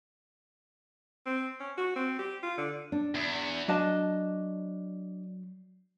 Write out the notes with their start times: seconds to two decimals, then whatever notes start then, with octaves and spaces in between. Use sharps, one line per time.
1.26 C4
1.60 C#4
1.78 F#4
1.96 C4
2.19 G4
2.43 F4
2.57 D3
2.92 D4
3.15 E2
3.68 F#3 D4 D#5 A5